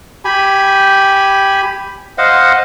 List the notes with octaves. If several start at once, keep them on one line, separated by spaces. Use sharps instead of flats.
G4 G#5 B5
C5 D#5 F5 F#5